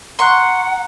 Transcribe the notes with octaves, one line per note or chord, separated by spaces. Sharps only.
F#5 A#5 C6 C#6 F#6